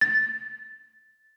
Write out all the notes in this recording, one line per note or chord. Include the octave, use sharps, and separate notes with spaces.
A6